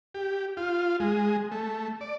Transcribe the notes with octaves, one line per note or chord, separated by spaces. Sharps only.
G4
F4
G#3
A3
D5